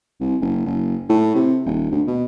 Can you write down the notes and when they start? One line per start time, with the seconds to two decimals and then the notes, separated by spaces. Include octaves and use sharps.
0.20 C2
0.41 F#1
0.66 F#1
1.09 A2
1.35 C3
1.66 D#1
1.91 D2
2.07 B2